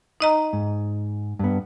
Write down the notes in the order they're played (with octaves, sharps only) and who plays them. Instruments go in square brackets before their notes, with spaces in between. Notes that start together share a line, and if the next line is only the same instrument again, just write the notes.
[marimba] D#4 D#5 A#5
[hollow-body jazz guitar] G#2
G2 B3